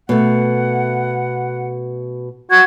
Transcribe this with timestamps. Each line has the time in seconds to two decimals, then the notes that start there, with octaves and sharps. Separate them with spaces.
0.09 B2 A3 F#5
2.51 F#4 G#6